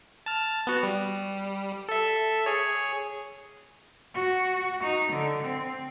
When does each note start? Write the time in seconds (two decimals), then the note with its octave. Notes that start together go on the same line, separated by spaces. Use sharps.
0.26 A5 F6
0.67 B3 F#4
0.83 G3
1.88 A4 E5
2.46 G#4 C#5
4.15 F#4
4.84 D#4
5.13 D3
5.44 C4